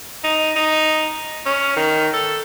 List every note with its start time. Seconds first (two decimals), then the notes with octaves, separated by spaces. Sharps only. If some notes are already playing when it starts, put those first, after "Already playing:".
0.24 D#4
0.56 D#4
1.46 C#4
1.76 D#3
2.14 A4